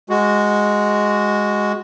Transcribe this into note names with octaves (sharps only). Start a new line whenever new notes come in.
G#3 F#4